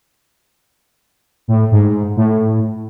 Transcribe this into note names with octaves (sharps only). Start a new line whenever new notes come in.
A2
G#2
A2